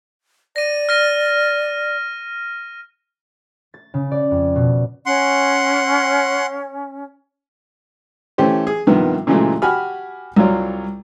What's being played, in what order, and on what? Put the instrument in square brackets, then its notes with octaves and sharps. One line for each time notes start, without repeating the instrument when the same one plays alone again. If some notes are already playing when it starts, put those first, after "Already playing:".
[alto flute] D5 [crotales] A#6 D#7
[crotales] F6 A#6 D#7
[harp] A6
C#3
D5
F2
B2
[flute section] C#4 [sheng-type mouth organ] F#5 C6
[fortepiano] E3 A3 C#4 G4 C5
G#4
G2 C3 D#3 F3 B3
A#2 C#3 E3 F#3 G#3 A3
F#4 G4 G#5 B5 F6
C2 F#3 F4 C#5 D5